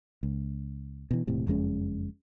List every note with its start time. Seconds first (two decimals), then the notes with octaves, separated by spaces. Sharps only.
0.23 C#2
1.11 B2 E3
1.27 E1 A2 C3
1.47 F#1 F2 G#3 C#4